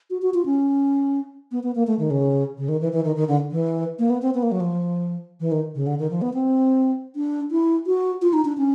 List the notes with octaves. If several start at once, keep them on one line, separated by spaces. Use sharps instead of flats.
F#4
F#4
F4
C#4
B3
B3
A#3
A3
D#3
C#3
C#3
D#3
E3
E3
D#3
D#3
D3
E3
A#3
B3
C4
B3
A#3
F#3
F3
E3
D#3
C#3
D3
D#3
F3
B3
C4
D4
E4
F#4
F4
D#4
D4
C#4